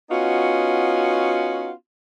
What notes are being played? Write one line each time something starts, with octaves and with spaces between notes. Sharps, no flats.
B3 C#4 D#4 F4 F#4